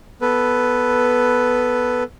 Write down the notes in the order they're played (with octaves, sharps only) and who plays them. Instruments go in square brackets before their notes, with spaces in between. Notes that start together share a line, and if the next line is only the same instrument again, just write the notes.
[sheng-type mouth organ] B3 A4 B4